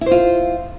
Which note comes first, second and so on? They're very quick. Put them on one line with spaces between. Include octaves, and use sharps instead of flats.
E4 C5 F4